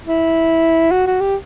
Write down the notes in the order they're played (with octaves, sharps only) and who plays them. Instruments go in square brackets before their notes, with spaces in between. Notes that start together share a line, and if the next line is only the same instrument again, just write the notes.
[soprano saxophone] E4
F#4
F#4
G4